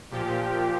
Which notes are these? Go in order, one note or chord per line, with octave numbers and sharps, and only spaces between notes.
A#2 F3 G4